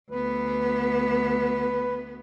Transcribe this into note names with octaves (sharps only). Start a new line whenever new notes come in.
D2 B3 B4